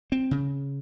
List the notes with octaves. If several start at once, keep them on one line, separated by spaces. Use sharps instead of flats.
C4
C#3